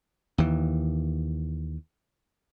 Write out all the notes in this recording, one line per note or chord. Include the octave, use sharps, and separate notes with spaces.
D#2 E3